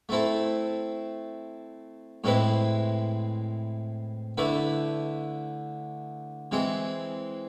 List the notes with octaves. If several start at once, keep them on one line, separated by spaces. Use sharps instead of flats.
A3 C4 E4 A4
A2 G#3 C4 E4 B4
D3 A3 E4 B4
E3 G#3 C4 G#4